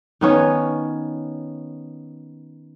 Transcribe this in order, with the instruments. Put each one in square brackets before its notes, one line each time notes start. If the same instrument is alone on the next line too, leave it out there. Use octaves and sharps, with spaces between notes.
[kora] D#3 B3 C#4 C#5